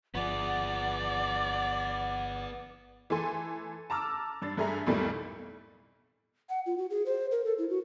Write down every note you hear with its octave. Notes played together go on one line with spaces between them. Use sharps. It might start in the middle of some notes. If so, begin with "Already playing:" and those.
G1 F3 B3 G#4 D5 F#5
E3 A3 A4 G#5 C6
A5 A#5 D6 E6 F6
G2 D4 A6
G2 A3 G#4 E5 A#5
B1 F2 A2 D#3 G3 A3
F#5
F4
F#4
G#4
C5
A#4
A4
E4
F#4